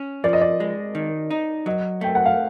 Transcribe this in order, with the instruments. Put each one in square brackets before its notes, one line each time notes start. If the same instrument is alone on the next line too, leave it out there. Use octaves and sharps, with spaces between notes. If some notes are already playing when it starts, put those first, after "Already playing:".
Already playing: [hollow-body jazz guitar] C#4
[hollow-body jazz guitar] F3 [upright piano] D5
[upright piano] D#5
D5
[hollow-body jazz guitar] G#3
D#3
D#4
[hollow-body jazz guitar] F#3 [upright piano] D#5
[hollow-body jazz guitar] A3 [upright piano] G5
[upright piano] F#5
F5